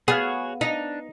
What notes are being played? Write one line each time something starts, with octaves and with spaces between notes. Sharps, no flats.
B3 F#4 G#4 C#5 F5
D4 D#4